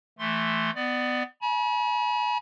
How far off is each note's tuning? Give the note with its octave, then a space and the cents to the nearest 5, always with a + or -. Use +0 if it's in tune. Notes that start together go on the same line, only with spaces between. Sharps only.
E3 +0 A3 +0 C6 +0
B3 +15 D5 +25
G#5 +40 B5 -40